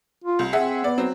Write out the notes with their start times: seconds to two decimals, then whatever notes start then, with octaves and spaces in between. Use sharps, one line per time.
0.25 F4
0.39 C2
0.53 C4 G#4 E5 F#5
0.84 B3 D5
0.98 F#3 C4